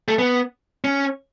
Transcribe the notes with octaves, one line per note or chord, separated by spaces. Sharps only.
A3
B3
C#4